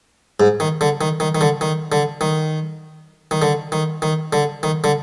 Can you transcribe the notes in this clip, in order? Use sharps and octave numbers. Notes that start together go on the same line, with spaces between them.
G#2
D#3
D3
D#3
D#3
D#3
D3
D#3
D3
D#3
D#3
D3
D#3
D#3
D3
D#3
D3